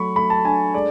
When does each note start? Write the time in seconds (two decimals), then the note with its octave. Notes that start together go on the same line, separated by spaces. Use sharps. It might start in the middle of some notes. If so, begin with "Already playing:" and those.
Already playing: F#3 A3 B5 C#6
0.16 A3 B5
0.30 A5
0.44 D4 G#5
0.74 G#3 D5